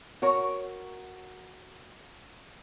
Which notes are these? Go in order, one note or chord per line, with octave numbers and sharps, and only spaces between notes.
F#4 A#4 C#5